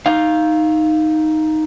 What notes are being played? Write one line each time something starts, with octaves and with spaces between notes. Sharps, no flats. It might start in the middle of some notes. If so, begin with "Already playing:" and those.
D#4 F5